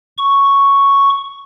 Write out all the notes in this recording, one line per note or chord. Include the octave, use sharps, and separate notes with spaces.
C#6